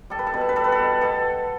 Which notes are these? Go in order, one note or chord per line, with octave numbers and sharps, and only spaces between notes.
G3 A4
B4
A4
B2 B4
A4
B4
G3 A4
B4
A4
B2
B2 A4